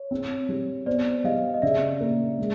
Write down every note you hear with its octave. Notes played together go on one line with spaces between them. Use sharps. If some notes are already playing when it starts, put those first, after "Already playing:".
Already playing: C#5
C4
G3
B3 C5 D5
G3 D#5 F5
D#5
C#3 D5 E5
A#3
G#3